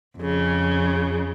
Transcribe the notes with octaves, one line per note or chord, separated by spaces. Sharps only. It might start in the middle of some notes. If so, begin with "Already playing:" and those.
F2 C#3